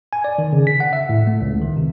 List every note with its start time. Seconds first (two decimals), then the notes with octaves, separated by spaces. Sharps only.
0.13 G#5
0.24 D5
0.38 D#3
0.53 C#3
0.67 B6
0.80 F#5
0.93 E5
1.09 A2
1.27 A3
1.41 C#2
1.62 D#3
1.77 C3